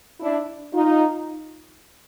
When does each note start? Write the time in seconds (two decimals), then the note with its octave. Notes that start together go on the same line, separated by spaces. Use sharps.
0.20 D4 E4
0.74 D#4 F4